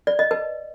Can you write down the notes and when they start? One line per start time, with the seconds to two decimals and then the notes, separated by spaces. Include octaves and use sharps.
0.07 D5
0.19 D#5
0.31 B4